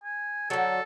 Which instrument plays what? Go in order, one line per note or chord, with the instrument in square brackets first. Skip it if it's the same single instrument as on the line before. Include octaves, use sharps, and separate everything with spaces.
[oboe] G#5
[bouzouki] D3 F#3 [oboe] A4